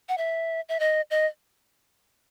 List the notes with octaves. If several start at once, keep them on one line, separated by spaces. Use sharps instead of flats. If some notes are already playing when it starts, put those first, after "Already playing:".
F#5
E5
E5
D#5
D#5